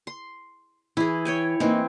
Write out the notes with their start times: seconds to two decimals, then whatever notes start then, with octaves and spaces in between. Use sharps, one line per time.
0.07 C6
0.97 E3 E4 G#4
1.25 C#5 G5 G#5
1.60 E3 A#3 C4 D#4